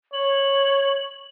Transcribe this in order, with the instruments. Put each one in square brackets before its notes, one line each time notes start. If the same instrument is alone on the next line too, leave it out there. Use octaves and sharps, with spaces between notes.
[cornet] C#5 [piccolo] F#7